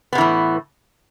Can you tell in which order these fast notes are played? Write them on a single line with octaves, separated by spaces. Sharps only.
B3 C3 E3 A2